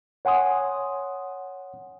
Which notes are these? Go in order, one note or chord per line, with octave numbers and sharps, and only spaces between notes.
C#5 F#5 G#5 C6 D#6